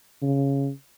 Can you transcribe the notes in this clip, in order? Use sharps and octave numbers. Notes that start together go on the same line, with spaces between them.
C#3